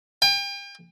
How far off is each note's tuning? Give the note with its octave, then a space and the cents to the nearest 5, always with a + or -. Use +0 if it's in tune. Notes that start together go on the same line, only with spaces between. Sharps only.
G5 +40